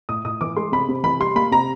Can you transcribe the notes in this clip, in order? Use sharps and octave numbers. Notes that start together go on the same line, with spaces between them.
A2 D#6
A2 D#6
E3 D6
G#3 C6
C3 B5
C3
E3 B5
G3 C6
A#3 B5
C3 A#5